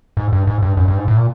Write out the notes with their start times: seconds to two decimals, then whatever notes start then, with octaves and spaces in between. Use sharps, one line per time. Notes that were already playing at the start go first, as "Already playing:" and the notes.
0.17 G#2
0.33 G2
0.47 G#2
0.62 G2
0.77 F#2
0.88 G2
0.98 G#2
1.08 A2
1.17 A#2